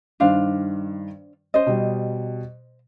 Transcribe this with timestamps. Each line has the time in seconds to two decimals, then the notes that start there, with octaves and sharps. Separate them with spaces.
0.20 G2 D#3 D4 C5 F5
1.54 C#4 C5 D#5
1.67 B2 G3